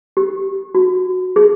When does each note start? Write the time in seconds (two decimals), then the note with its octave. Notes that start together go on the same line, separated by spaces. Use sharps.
0.17 G4
0.75 F#4
1.36 G#4